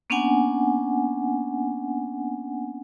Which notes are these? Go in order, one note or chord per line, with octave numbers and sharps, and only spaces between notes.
A#3 B3 C#4 D4 F#5 G#5